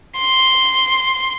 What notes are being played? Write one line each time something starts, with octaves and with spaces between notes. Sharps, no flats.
C6